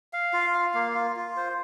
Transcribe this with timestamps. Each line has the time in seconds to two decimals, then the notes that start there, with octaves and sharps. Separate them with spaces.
0.13 F5
0.33 F4
0.55 F5
0.74 A#3
0.95 F4
1.16 F4
1.37 C5